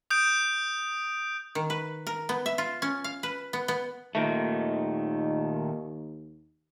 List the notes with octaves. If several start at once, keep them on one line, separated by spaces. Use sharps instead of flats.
D#6 G6 D7
D#3
B4
A#4
B3
E5
F4
C#4
F5
B4
B3
B3
D#2 A#2 D#3 A3